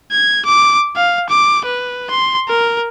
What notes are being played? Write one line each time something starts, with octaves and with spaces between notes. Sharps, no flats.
G#6
D6
F5
D6
B4
C6
A#4